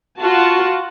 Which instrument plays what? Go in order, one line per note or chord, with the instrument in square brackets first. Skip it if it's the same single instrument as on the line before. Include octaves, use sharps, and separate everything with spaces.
[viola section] F4 F#4 A5